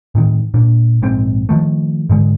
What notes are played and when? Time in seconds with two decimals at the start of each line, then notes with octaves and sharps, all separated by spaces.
0.15 A2 C3 D#3
0.54 A#2 D4
1.02 A#1 G#2 C4
1.49 D#3 F3 A3
2.09 G#2 D3 G#3